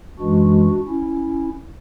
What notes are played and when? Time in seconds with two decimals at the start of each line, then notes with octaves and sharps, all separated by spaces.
0.19 F#2 E3 G#3 D4 F#4
0.88 C#4 E4